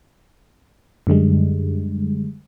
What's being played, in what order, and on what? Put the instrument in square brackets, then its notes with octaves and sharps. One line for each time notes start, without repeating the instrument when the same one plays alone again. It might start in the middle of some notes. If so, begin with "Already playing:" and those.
[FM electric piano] F#2 D3 G3 G#3